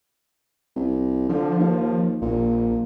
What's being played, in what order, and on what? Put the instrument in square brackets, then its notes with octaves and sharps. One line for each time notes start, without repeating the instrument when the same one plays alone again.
[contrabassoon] C2
[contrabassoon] D3 [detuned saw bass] F3
[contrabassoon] D#2
[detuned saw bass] A#1 [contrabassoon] A#2